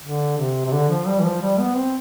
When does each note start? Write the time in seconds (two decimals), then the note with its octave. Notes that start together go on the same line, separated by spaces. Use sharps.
0.02 D3
0.37 C3
0.65 C3
0.72 D3
0.89 F3
1.07 G3
1.20 E3
1.24 F3
1.42 G3
1.59 B3
1.76 C4